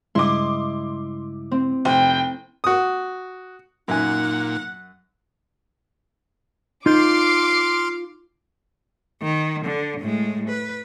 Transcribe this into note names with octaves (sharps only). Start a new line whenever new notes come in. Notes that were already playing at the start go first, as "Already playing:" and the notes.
G2 C#3 G#3 E4 D#5 C6 D6
C4
F1 C5 G5
F#4 D#6
F#2 A#2 D#4 F#5 G#5
D#4 F4 C6 D6 F6 G6 C7
D#3
D3
A2 G#3
B4